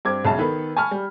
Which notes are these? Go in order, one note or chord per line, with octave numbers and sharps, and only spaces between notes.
G2 C4 D6 G#6
E1 B1 C#3 E5 A5
D#3 B3 A4 B4
G#5 A5 B5 C#6 F6
G3